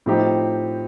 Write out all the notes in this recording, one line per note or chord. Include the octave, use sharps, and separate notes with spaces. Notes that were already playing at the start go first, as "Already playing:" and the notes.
A2 F3 C4 D#4 G4